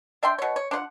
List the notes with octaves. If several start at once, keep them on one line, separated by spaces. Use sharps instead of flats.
D4 E5 G5 C6
B2 C#5
C#5
D4 F4 C5 F#5